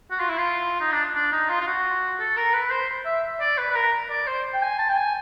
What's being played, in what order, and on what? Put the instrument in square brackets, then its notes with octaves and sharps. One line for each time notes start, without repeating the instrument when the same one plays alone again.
[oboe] F#4
F4
E4
F4
D#4
D4
D4
D#4
F4
F4
F#4
A4
A#4
B4
C5
E5
D5
B4
B4
A#4
D5
C5
G5
G#5
A5
G5
G#5